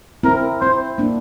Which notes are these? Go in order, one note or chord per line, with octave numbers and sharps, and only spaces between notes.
C4 E4 A#4
C4 E4 C5
A#3 D4